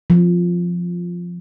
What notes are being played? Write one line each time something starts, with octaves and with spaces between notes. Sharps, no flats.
F3